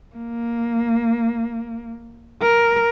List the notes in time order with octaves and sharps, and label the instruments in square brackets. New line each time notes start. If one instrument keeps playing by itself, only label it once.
[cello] A#3
A#4